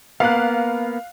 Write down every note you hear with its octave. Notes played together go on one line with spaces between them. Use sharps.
A#3 B3 F5 F#6